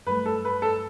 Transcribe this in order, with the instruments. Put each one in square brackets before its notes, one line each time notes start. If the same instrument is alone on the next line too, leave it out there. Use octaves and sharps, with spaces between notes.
[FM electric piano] G2 F#3 A3 [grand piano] B4
[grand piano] A4
B4
A4